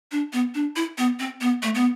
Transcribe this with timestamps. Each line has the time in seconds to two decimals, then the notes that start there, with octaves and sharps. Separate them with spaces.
0.12 D4
0.33 B3
0.54 D4
0.76 E4
0.98 B3
1.19 C4
1.41 B3
1.63 A3
1.75 B3